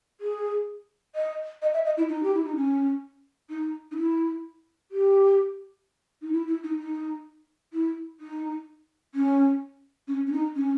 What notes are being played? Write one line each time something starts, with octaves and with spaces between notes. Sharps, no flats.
G#4
D#5
D#5
E5
D#5
E4
D#4
G4
E4
D#4
C#4
D#4
D#4
E4
G4
D#4
E4
E4
D#4
D#4
E4
D#4
C#4
C#4
C#4
D#4
C#4